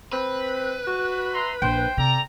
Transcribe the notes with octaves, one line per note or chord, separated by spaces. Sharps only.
C4 B4
F#4
E5 A#5 C6
A#1 C5 G5
C3 A4 D5 A#5